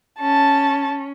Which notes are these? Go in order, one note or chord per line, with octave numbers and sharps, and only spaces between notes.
C#4 A5